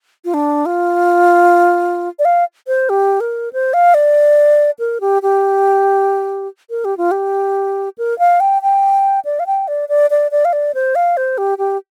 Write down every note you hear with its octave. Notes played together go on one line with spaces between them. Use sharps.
F4
D4
F4
D5
F5
C5
G4
A#4
C5
F5
D5
A#4
G4
G4
A#4
G4
F4
G4
A#4
F5
G5
G5
D5
F5
G5
D5
D5
D5
D5
F5
D5
C5
F5
C5
G4
G4